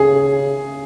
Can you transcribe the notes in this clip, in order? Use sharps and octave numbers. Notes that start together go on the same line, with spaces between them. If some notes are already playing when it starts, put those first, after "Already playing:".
Already playing: C#3 G#4